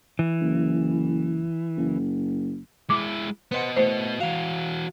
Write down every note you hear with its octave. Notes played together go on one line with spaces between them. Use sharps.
E3
F#1
F#1
G#3 E4 D6
B3 B4 C5 D#5 F#5
A2 C5
E3 F#4 F5